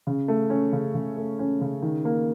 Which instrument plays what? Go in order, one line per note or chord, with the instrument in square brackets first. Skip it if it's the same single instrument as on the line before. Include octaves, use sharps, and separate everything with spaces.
[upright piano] C#3
A3
C#4
C#3
C#3
A3
C#4
C#3
D#3
A#3